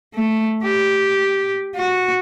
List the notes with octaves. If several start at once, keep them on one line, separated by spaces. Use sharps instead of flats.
A3
G4
F#4